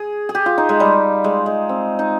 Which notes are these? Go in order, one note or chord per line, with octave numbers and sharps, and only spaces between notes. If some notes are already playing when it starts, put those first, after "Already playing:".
Already playing: G#4
G#4
G4
F4
D#4
G#3
G3
G#3
G#3
C4
D#4